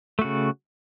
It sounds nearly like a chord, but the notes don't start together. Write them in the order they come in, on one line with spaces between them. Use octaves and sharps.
A3 F#4 C#3